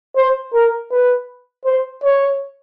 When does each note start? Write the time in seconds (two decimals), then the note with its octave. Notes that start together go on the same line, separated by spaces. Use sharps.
0.17 C5
0.54 A#4
0.92 B4
1.66 C5
2.04 C#5